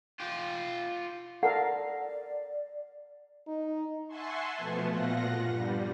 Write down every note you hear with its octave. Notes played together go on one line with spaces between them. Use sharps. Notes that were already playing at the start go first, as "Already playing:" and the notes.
F4 G4
A4 A#4 D5 F5 F#5
D#4
E5 F#5 G#5 A5 C6 C#6
B2 F3 A3 B3
A#2 F4 F#5 A#6
G2 G3